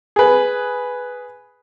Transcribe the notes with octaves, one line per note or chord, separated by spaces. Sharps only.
G#4 B4